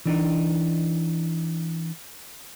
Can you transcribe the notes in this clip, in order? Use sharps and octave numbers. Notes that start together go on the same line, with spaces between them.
E3 D4 D#4